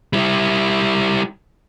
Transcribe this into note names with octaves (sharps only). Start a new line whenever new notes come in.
G3 E4